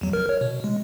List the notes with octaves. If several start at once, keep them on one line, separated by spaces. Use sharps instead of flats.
E2 F#3
G#1 A#4 F6
C#5
B2
G#3